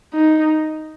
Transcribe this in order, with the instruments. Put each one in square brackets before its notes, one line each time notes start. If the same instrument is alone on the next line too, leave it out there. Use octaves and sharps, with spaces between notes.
[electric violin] D#4